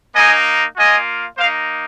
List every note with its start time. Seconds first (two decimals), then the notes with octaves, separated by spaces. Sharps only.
0.14 A#3 D#4 D#5 G#5
0.77 A#3 F4 D#5 G#5
1.37 A#3 D#4 C5 F5